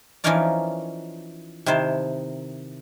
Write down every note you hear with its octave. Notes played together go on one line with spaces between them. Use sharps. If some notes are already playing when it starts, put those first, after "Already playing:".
E3 F3 C#4 D#4 A#4 D5
C3 D#3 E4 C5 A5